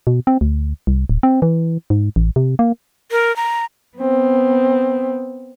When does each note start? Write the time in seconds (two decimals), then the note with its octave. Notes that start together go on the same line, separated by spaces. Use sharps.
0.07 B2
0.27 C4
0.41 D2
0.87 C2
1.09 D1
1.23 C4
1.42 E3
1.90 G#2
2.16 A1
2.36 C3
2.59 A#3
3.11 A#4
3.36 A#5
3.96 B3 C4